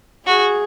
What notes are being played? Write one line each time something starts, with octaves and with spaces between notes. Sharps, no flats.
F#4 G#4